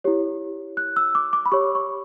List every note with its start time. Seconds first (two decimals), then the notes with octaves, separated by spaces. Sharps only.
0.04 E4 G4 C#5
0.77 F#6
0.96 E6
1.15 D6
1.33 D6
1.46 B5
1.52 G4 C#5 C#6
1.75 C#6